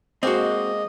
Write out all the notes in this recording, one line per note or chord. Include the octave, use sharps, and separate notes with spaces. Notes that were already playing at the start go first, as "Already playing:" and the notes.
G#3 A#3 C4 F#4 D#5 C6